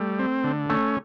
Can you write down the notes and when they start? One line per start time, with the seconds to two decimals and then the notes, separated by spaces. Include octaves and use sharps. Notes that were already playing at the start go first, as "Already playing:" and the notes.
Already playing: G3 A3
0.19 C4
0.44 D3
0.70 A3 C#4